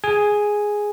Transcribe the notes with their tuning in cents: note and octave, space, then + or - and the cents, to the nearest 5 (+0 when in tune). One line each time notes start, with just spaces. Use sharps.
G#4 +0 G#5 +0